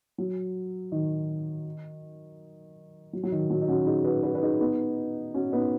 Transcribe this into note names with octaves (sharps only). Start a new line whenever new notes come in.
F#3
D#3
F#3
F#3
D#3
F#3
D#4
C#4 F#4
D#4 G#4
F#4 B4
F#4 B4
B4
D#4 G#4
B3 D#4
C#4 F#4
B3 D#4